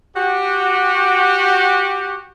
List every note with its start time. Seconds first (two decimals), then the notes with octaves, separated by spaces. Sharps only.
0.16 F#4 G4